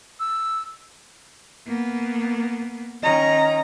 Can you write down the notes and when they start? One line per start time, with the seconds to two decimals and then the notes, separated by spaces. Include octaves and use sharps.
0.20 E6
1.66 A#3 B3
3.03 D#3 C#4 D#5 A#5